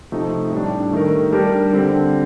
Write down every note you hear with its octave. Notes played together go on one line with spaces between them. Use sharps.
C3 F3 A3 D#4
A2 G3 D4
D#3 A3 D#4 A#4
G3 D4 G4 A#4
D3 G3 C4